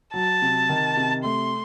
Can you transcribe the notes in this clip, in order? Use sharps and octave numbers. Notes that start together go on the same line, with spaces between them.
F#3 A5
C3
D#3
C3
A3 C6